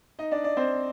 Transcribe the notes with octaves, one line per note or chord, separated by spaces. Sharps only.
D#4 D#5
D4 D5
D4 D5
C4 C5